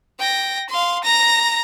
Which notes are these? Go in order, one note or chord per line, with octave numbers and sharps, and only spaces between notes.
G5 A#6
F5 C6
A#5 A#6